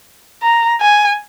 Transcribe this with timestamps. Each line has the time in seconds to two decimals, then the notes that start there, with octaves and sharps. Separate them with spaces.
0.42 A#5
0.81 G#5